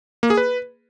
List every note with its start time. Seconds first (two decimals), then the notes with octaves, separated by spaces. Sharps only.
0.23 A#3
0.30 G#4
0.37 B4